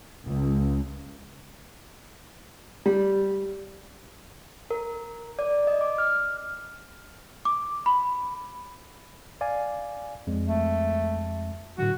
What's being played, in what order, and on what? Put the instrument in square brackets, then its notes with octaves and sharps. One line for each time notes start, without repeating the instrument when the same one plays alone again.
[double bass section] C#2
[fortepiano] G3
[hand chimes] A#4
D5
D#5
D6
F6
[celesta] D6
B5
[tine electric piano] D5 F5 G#5
F2 G#3 C4
[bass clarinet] A3
[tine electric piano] A2 D3 F#3 [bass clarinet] F#4